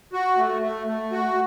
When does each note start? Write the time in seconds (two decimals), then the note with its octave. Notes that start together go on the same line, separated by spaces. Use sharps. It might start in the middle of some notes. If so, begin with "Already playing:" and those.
0.13 F#4
0.37 A3
0.62 A3
0.87 A3
1.12 F#4